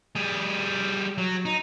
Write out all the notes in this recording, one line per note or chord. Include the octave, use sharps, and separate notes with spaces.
G3 G#4
F#3
D#4